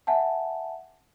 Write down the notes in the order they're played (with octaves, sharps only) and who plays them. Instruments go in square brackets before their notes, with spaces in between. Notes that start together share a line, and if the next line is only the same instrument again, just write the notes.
[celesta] E5 F#5 G#5 A5